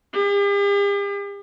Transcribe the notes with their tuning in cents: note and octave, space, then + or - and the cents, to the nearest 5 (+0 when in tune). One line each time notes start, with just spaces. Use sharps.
G4 +45